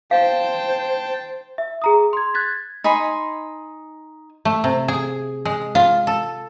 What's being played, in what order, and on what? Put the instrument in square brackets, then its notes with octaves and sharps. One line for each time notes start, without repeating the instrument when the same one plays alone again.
[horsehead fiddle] C5 [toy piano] F5 [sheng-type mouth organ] G5 A5
[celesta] E5
G#4 A#5 D#6
C6 G#6
F#6 G#6 A6 B6
[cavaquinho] D#4 G#5 B5 C6
[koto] A3
C3
G#4
G#3
F4
A4